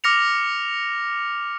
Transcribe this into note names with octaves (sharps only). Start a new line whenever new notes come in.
D6 F6 A#6 C#7 F7